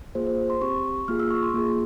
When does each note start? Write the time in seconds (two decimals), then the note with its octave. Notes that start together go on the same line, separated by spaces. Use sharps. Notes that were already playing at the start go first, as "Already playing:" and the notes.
0.15 A#3 F4 G#4 C5
0.27 C5
0.50 C6
0.62 C4 G4 C#6
1.08 A#3 F4 G#4 F6
1.19 E6
1.30 C#6
1.43 C6
1.54 A#3 F4 G#4